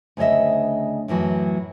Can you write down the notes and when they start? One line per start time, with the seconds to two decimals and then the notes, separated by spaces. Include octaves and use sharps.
0.17 D2 C#3 C#5 D#5 E5
1.08 F#2 A2 E3 F#3